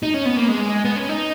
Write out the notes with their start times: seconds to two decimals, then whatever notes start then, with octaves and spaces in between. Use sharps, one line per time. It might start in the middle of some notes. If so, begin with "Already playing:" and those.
0.03 D#4
0.14 C#4
0.26 B3
0.37 A#3
0.49 G#3
0.85 B3
0.96 C#4
1.09 D#4